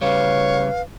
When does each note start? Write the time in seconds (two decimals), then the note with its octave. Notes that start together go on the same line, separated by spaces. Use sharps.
0.01 C#3 G3 B4 C#5 F5